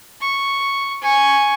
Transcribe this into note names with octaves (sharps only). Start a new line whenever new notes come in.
C#6
G#5 C#6